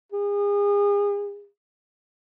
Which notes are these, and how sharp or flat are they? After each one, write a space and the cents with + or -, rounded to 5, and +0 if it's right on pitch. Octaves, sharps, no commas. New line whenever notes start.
G#4 -35